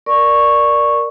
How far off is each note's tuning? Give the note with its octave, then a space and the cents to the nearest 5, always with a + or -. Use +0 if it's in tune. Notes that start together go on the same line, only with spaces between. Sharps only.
A#4 +10 D5 +5 C#6 -5